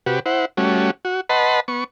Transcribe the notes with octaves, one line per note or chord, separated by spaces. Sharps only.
C3 F#4 G4 B4
E4 C5 F#5
G3 A3 C#4 F#4
F#4
B4 D#5 F#5 A5 B5 C6
B3 C#6